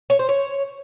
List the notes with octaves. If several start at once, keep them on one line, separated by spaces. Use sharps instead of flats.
C#5
C5
C#5